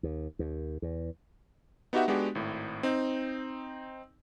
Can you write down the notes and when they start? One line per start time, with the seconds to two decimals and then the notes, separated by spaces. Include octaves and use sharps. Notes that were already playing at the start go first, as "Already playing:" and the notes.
0.03 D#2
0.39 D#2
0.82 E2
1.93 B3 D#4 F#4 G4 E5 F#5
2.08 G#3 B3 D4 F#4 G4
2.35 G#1 A2
2.83 C4 D#4